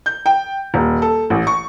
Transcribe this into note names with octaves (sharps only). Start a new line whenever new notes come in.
G6
G5
D#1
A4
A1
C#6